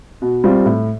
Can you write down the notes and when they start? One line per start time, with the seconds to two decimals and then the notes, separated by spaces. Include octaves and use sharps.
0.22 B2
0.44 G3 C4 F4
0.65 A2